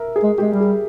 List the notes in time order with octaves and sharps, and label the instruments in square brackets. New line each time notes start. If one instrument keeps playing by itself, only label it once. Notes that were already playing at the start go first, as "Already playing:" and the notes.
Already playing: [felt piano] A#4 E5
G#4
[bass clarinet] G#3
[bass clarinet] G#3 [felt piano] G4
[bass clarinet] G3
[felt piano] G#4